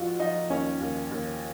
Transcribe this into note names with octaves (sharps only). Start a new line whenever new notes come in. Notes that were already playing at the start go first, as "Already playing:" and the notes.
Already playing: F2 F3 F4 F#4
F3 D#4
D#2 C#4
D#2
D#2